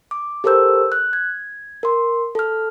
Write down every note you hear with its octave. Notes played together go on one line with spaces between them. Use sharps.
D6
G4 A4 A#4 C5 E6 G6
F#6
G#6
A#4 C6
A4 F6